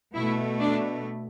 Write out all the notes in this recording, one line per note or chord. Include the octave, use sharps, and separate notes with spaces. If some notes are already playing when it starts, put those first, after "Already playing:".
B2 A3 E4
D4